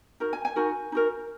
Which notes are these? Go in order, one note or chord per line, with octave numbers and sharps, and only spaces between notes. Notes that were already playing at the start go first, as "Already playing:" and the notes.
D#4 F#4 A#4
G#5
G#5
D#4 F#4 A#4
D#4 F#4 A#4